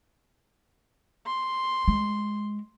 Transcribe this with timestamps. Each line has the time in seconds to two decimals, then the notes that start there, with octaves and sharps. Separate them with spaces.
1.26 C6
1.88 G#3